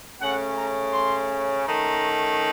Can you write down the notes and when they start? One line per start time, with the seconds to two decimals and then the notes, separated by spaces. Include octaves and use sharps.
0.20 C#3 A3 C#4 F#5
0.57 A#5
0.93 C6
1.66 D#3 A3 C#4 A#5